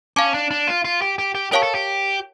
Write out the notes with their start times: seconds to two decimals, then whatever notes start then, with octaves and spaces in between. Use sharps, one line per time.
0.16 C#4 F5 A5 D6
0.34 D4
0.51 D4
0.67 F4
0.85 F4
1.02 G4
1.18 G4
1.35 G4
1.52 G4 A#4 C#5 F5 A5 C#6
1.63 A4
1.75 G4